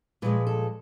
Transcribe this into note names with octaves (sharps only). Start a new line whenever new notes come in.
A#2 F3 G#3 B4
A4